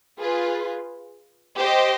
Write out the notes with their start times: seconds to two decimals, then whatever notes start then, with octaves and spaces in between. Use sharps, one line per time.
0.20 F4 G#4 B4
1.58 G4 C5 D#5